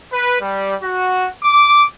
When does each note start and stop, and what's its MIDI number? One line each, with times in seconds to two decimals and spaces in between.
0.11 0.38 71
0.41 0.74 55
0.82 1.27 66
1.44 1.85 86